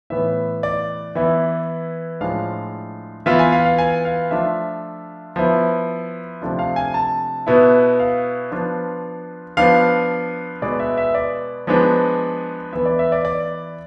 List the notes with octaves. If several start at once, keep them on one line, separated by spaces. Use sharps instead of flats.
A2 E3 B3 E5
D5
E3 B3 E4
A2 F3 G#3 D4 F4 F5
E3 B3 F4 E5
G#5
F5
F5
G#5
F5
F3 A3 D4 F4 E5
F3 B3 E4
C3 F3 A3 D4 F4
F5
G#5
A5
B2 B3 E4
F5
F3 B3 D4 F4
F3 B3 D4 F5
B2 G#3 B3 D5
E5
E5
D5
F3 G#3 B3 D4
E3 B3 E4 E5
D5
E5
D5
D5